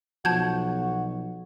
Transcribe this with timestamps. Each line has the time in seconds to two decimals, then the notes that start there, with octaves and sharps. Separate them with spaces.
0.25 B1 F3 F#4 A5 G6 G#6